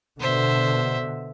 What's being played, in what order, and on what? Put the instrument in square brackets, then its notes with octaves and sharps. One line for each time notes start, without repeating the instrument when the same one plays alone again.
[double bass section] B2 D3 [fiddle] C5 E5